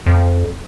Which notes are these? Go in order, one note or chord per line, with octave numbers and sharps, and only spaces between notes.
F2